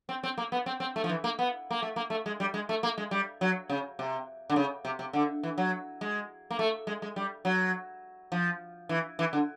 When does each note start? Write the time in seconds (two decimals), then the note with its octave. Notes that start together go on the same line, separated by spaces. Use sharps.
0.09 C4
0.23 C4
0.38 A#3
0.52 B3
0.66 C4
0.80 C4
0.96 A3
1.04 F3
1.09 E3
1.24 A#3
1.39 B3
1.71 A#3
1.82 A3
1.96 A#3
2.10 A3
2.26 G#3
2.40 G3
2.54 G#3
2.69 A3
2.83 A#3
2.98 G#3
3.11 G3
3.41 F#3
3.69 C#3
3.99 C3
4.50 D3
4.56 C#3
4.85 C3
4.99 C3
5.13 D3
5.43 E3
5.58 F#3
6.01 G#3
6.51 A#3
6.59 A3
6.87 G#3
7.02 G#3
7.16 G3
7.45 F#3
8.32 F3
8.89 E3
9.19 E3
9.33 D3